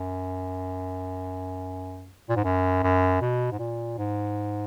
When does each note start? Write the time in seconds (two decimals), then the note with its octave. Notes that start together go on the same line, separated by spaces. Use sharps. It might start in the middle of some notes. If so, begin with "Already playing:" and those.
Already playing: F#2
2.29 A#2
2.36 G#2
2.44 F#2
2.83 F#2
3.21 B2
3.52 G#2
3.59 A#2
3.98 G#2